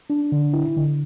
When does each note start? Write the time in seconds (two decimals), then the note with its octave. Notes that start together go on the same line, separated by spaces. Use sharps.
0.10 D4
0.32 D3
0.53 E4
0.77 D3